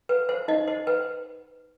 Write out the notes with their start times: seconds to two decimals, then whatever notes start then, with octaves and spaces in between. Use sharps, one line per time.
0.09 B4
0.29 C5
0.48 D#4 D#5
0.68 C5
0.87 B4